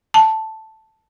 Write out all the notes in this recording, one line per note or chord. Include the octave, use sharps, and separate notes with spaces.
A5